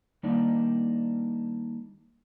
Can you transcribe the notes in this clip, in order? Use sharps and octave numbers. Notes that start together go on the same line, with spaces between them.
D#3 G3 A#3 D4 D#4 D5